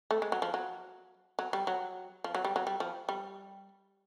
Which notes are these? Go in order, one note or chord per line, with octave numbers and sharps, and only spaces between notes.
A3
G#3
F#3
F3
F#3
F#3
G3
F#3
F3
F#3
G3
F#3
G3
F3
G3